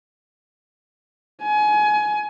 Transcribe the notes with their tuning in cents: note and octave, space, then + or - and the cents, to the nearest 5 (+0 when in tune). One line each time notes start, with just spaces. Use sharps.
G#5 +25